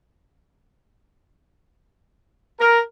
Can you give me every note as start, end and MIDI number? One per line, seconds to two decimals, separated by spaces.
2.60 2.81 70